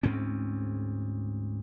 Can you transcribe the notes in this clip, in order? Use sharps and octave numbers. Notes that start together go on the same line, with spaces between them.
D2 G#2 C4 C#4